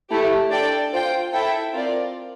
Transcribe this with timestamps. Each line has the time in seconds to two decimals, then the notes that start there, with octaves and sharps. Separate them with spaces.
0.11 A3 E4 G4
0.51 D4 A4 D5 G5
0.92 F4 C5 G5
1.32 E4 A4 E5 G5
1.73 C4 F4 A#4 D5